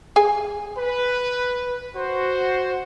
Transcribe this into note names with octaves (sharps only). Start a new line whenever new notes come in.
G#4 G#5
B4
F#4 C5